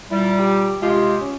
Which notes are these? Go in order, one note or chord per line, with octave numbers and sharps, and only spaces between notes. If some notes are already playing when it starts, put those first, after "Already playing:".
A#2 G3 E4
G4
C3 G#3 F4 G4
C#4